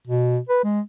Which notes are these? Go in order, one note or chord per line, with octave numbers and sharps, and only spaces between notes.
B2
B4
G#3